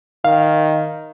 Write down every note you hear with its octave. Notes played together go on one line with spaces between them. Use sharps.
D#3 F5